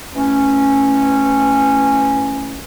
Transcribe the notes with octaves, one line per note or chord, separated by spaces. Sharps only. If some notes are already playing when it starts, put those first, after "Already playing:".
E3 A3 C#4